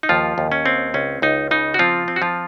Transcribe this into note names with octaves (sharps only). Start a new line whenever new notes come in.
D#4
D#2 F3 F4
D#2
C#4
C4
C#2 C#4
C#2 D#4
C#3 D#4
F#4
F3 C4 F4
C4
F#4
F3 F4